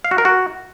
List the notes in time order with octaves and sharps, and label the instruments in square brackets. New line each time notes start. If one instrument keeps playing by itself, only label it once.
[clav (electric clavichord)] F5
F#4
A#4
F#4